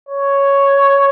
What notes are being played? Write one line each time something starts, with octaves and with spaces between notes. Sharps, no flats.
C#5